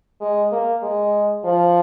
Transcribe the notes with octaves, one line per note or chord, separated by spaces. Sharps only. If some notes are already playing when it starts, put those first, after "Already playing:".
G#3
A#3
G#3
F3